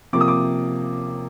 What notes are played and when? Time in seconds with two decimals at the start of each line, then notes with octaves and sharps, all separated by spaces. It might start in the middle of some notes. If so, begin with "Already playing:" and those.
0.13 C3 F3 A#3 D6
0.21 D#6
0.28 D6